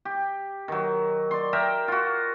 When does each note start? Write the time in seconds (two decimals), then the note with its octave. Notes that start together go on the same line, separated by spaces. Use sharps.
0.05 G4
0.68 D#3 F#3
1.31 D5 C6
1.53 A#4 E5 G5 A#5
1.88 F4 F#4